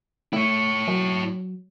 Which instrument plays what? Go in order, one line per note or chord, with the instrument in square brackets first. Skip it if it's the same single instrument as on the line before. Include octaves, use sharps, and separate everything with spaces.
[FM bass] A3 [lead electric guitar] E4 C#5
[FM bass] F#3